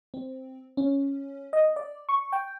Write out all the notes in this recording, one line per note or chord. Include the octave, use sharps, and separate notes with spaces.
C4
C#4
D#5
D5
C#6
G5